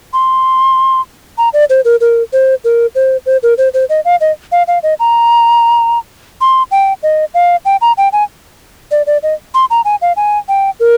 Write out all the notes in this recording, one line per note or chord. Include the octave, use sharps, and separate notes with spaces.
C6
A#5
D5
C5
A#4
A#4
C5
A#4
C5
C5
A#4
C5
C5
D#5
F5
D#5
F5
F5
D#5
A#5
C6
G5
D#5
F5
G5
A#5
G5
G#5
D5
D5
D#5
C6
A#5
G#5
F5
G#5
G5
A#4